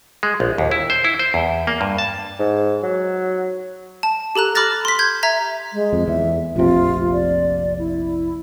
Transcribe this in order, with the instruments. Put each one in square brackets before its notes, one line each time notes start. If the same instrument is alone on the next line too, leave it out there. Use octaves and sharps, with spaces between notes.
[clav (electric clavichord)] G#3
A#1
D#2
E4
C5
E4
C5
E2
A#3
G2
A5
[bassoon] G#2
F#3
[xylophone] A5
G4 A4 A#5 F#6
B5 D6 F6 F#6 A6 A#6
C6 B6
G6 G#6
E5 A#5 G#6 B6
[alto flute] G#3
[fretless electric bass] F2
[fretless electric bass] E2 [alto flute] E5
[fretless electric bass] F1 A#1 C3 [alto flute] F4
[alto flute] D5
E4